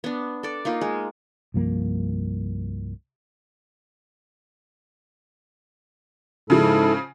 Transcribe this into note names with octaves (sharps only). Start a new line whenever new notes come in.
B3 D4
A4 D5
A#3 D#4 F4
G#3
C2 G2 F3 A#3
G#2 C#3 F3 E4 A4